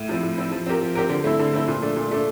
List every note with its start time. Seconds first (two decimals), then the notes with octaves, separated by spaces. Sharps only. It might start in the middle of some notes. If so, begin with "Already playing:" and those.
Already playing: A2
0.09 F3 C4 E4
0.23 A2
0.38 F3 C4 E4
0.52 F3
0.66 C4 G4 A#4
0.82 F3
0.95 C4 G4 A#4
1.09 D3
1.24 A3 C4 E4
1.40 D3
1.54 A3 C4 E4
1.68 A#2
1.82 A3 D4
1.96 A#2
2.11 A3 D4